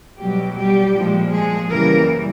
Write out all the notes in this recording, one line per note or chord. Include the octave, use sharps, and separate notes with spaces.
B2 F#3 G3 G4
G3 G4
A#2 F3 G#3
G#3 G#4
F#2 C#3 E3 G3 A#3 A#4